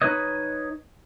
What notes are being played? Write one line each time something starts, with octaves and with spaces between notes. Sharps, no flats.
D#4 F4 B4 C#5 D#5